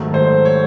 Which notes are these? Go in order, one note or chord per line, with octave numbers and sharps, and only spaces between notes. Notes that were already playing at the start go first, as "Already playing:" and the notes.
Already playing: G#2 D#3 F#3 A3
C5
C#5